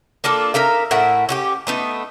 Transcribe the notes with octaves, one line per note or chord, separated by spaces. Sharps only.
A#3 D4 F4 A4
D#4 A#4 E5 F5
A2 A#4 E5 F#5
C#4 F#4 G4
A3 B3 D#4